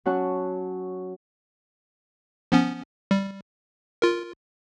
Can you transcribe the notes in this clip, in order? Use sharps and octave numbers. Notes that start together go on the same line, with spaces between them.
F#3 C#4 F#4 F#5 A5 F#6
F3 B3 C#4
G3
F4 A#4